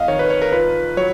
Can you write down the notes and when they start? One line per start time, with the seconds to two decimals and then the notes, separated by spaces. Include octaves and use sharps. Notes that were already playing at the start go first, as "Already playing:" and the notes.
Already playing: F2 D#5 F5
0.08 D#3 C#5
0.19 B4
0.30 C#5
0.42 A#4
0.52 F4 B4
0.97 F#3 C#5